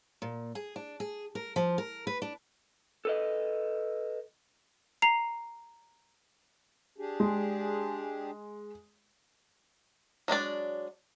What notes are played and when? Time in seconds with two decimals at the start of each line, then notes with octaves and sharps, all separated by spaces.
0.22 A#2
0.55 G#4
0.76 D4
1.00 G#4
1.35 A#4
1.56 F3
1.78 A#4
2.07 B4
2.22 D4
3.05 A4 B4 D#5
5.02 A#5 C7 F7
6.98 D4 G4 G#4
7.20 G#3
10.28 F#3 G#3 D4 D5